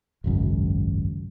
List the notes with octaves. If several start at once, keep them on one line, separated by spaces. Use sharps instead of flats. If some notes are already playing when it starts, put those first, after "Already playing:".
G#1 C#2 F#2